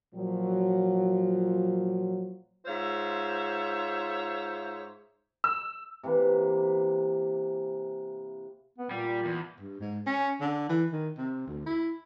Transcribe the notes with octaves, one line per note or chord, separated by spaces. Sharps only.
A#2 F3 F#3
G#2 F4 C5 C#5 E5
E6
C3 E3 A#3 B4
B3
A#2 G3
E2
G2
G#2
C#4
D3
E3
D#3
C3
D2
E4